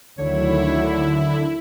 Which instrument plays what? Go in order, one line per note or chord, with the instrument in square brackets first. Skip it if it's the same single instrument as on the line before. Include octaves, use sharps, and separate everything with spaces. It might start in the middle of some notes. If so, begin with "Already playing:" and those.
[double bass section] D2 D#3 F#3 [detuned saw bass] D3 [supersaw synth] E4 [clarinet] C#5